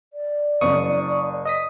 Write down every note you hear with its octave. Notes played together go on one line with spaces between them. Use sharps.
D5
F#1 C#6 D#6
D#5 D#6 B6